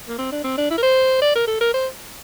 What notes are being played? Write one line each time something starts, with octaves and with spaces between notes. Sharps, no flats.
A#3
C4
D4
C4
D4
E4
A#4
C5
D5
A#4
A4
A#4
C5